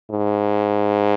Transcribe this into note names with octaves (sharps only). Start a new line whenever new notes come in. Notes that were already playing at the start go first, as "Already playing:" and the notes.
G#2